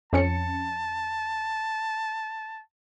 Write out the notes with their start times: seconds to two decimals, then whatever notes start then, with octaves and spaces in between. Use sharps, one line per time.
0.13 F2 C#4 A5 C#7